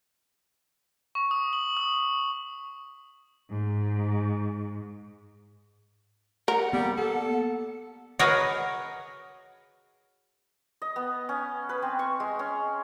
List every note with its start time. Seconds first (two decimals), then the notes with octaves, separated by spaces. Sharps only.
1.15 C#6
1.31 D#6
1.53 F#7
1.77 D#6
3.50 G#2
6.48 A#4 F#5
6.73 G3 A#3 B3
6.98 A4
8.19 F#4 G#4 A#4 B4 C#5 D#5
10.82 D#5
10.96 B3
11.29 C#4
11.69 B4
11.82 C4
11.99 C#6
12.20 G#3
12.39 C#4